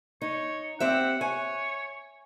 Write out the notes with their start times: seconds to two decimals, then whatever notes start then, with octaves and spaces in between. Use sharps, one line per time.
0.22 D#4 C#5
0.80 C4 G4 E5 F#5
1.21 C#5 G#5